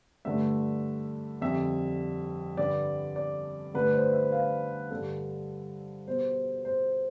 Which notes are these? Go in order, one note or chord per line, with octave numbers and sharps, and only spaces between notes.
G2 D3 A3 E5
F2 D3 G3 E5
G2 D3 G3 D5
D5
G2 D3 A3 B4
C5
E5
F5
G2 D3 G3 A4
B2 G3 C5
C5